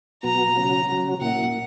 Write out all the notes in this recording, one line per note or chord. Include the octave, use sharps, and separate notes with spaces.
B2 F#3 B3 F#4 A#5
C#3 F#3 C#4 F#4
C#3 F#3 C#4 F#4
A#2 A#3 E4 F#5